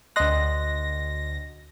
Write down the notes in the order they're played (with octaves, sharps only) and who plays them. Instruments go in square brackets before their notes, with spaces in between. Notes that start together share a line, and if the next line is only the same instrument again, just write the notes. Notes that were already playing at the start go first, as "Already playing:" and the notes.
[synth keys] D2 A#6 [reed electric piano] D#5 C6 F#6